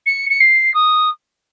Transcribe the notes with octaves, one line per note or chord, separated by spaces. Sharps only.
C#7
C#7
C7
D#6